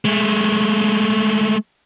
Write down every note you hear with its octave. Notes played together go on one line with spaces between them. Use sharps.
G#3 A3